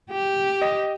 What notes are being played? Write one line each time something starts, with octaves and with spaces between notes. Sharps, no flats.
G4
D#5